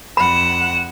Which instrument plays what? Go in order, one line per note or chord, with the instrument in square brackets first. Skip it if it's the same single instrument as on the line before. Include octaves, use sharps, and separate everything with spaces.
[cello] F2 F#5 [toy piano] B5 [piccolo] E7